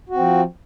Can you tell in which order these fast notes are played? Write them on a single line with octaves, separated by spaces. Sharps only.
F#4 C4 F3